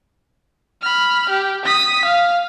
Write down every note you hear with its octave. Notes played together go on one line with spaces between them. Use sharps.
B5 F6
G4
D#6 B6
F5